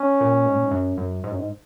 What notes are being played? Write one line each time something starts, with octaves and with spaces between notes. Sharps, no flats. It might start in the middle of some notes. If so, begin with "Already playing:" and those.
Already playing: C#4
A#2
G#2
A#2
G#2
F#2
F#2
G#2
F#2
G#2